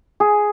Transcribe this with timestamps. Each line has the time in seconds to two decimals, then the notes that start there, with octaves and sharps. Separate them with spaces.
0.20 G#4